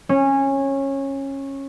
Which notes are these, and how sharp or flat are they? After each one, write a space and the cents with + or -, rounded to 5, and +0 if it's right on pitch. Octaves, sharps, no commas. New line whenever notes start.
C#4 -20